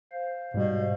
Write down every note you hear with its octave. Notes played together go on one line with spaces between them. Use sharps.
C5 F5
G#2 B2 G3